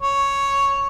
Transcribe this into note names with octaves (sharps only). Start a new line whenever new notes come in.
C#5